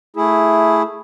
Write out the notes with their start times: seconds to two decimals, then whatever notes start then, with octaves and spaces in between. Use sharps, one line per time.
0.16 A3 E4 G#4